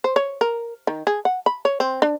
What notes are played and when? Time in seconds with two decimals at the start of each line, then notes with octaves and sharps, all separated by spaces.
0.04 C5
0.16 C#5
0.41 A#4
0.87 D#3
1.07 G#4
1.25 F#5
1.46 B5
1.65 C#5
1.80 C4
2.02 D4